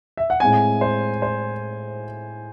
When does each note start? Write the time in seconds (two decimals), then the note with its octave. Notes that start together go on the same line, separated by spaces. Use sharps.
0.17 E5
0.30 F#5
0.40 A2 G#3 C4 G#5
0.81 C5
1.22 C5